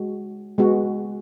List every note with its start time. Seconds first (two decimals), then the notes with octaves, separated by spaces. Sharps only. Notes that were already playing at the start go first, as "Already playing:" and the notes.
Already playing: G#3 F#4
0.58 G#3 B3 F#4